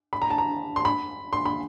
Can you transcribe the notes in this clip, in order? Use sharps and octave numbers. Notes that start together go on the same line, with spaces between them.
B5
A#5
A5
A#5
C6
B5
C6
B5